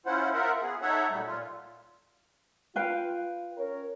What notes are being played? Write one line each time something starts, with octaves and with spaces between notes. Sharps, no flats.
C#4 E4 F4 C5 F#5
F4 A#4 E5 F#5
B3 G#4
D#4 A4 C#5 E5 F#5
A#2 F#3 G3 A3
A#2 F4
F4 B4 F5 G5
C#4 A#4 C#5